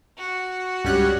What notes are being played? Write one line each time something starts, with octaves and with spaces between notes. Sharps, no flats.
F#4
C#2 G2 G3 C#4 G4 F#6